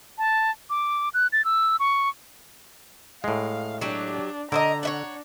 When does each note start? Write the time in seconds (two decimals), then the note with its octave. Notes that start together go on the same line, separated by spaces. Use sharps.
0.18 A5
0.70 D6
1.14 F#6
1.32 A6
1.45 E6
1.80 C#6
3.24 A2 G#3 F5
3.81 F#3 D4 G4
4.52 D3 A#4 C5 D#5 A#5
4.83 D4 C#5 E5 F#5